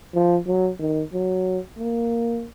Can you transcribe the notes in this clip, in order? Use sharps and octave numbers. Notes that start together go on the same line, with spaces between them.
F3
F#3
D#3
F#3
A#3